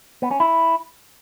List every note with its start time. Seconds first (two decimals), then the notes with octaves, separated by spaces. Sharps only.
0.22 B3
0.31 C#4
0.40 E4